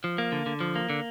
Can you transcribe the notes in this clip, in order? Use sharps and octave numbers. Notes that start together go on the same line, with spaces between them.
F3
A#3
D3
D3
F3
A#3
D3